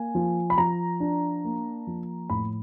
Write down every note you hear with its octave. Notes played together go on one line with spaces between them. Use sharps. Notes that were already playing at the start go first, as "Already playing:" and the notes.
Already playing: A#3 G#5
F3
B5
F3 A#5
D4
A#3
F3
A2 B5